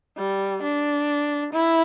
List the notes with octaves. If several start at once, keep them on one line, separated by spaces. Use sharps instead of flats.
G3
D4
E4